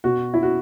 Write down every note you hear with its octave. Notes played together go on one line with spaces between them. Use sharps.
B2 F#4
E4
F#4